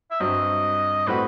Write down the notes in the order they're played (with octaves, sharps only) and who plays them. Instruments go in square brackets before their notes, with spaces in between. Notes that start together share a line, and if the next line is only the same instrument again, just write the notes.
[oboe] E5
[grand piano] G2 F#3 C4 [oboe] D#5
[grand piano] A2 G3 C4 F#4 [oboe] B4